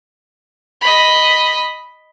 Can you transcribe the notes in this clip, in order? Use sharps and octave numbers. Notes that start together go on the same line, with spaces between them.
D#5 B5